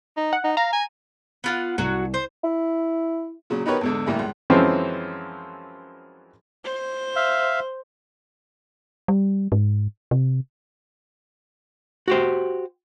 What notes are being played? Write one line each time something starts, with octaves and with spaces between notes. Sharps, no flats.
D#4
F#5
D#4
F5 A#5
G#5
B3 F4 F#5
C2 F#3 F#4
C5
E4
A#2 C#3 F#3
B3 D#4 G4 A#4 B4 C#5
E2 G#2 D3
A1 G2 A#3 E4
C#2
F#2 E3 F3 G#3 C4 C#4
C5
E5 F5
G3
G#2
C3
F#4 G4 C5